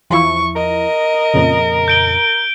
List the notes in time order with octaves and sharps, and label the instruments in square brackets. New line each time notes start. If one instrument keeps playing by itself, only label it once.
[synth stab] E2 F3 E4 [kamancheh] C#6
[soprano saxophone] A#4 [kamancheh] D#5
[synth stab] F2 A#2 C#3
[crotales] G6 D7 G7